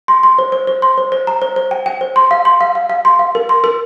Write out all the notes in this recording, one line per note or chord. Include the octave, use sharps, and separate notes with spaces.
C6
C6
C5
C5
C5
C6
C5
C5
A#5
C5
C5
G5
G5
C5
C6
F5
C6
F5
F5
F5
C6
F5
A#4
C6
A#4